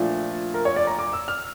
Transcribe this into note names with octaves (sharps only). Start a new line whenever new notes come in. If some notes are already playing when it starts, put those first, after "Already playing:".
Already playing: A#2 F3 A3 D4
A#4
C#5
D5
A#5
D6
E6
F6